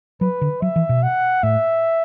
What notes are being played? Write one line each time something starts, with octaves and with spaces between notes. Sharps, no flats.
F#3 B4
D3
F#3 E5
E3
B2
F#5
A2 E5